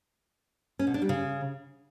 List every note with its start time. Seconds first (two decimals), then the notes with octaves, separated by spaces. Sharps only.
0.79 C#4
0.87 B2
0.94 D4
1.02 G3
1.09 C#3